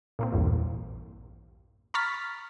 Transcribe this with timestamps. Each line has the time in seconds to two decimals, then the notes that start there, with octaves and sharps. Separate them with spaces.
0.19 A#2 A#3 C4
0.32 A#1 E2 G2 A#2
1.94 A#5 B5 C#6 F6 A6 B6